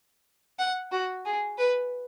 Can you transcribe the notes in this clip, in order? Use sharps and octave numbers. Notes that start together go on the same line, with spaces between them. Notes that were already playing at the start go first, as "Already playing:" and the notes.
F#5
F#4
G#4
B4